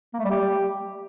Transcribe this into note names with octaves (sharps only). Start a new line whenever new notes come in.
A#3
A3
G3
G4